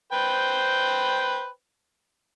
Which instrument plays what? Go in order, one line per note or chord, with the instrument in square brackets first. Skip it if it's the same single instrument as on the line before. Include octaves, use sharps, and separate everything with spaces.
[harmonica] B4 C5 G5